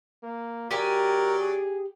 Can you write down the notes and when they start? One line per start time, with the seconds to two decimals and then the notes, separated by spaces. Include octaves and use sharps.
0.23 A#3
0.71 F#3 G4 A#4 D5 G5 G#5
1.39 G#4